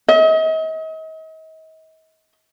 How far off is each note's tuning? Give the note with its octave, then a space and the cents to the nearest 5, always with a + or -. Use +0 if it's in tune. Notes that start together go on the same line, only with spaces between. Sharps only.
D#5 +40